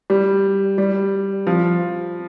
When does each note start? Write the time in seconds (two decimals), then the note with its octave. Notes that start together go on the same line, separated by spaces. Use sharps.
0.10 G3
0.78 G3
1.47 F3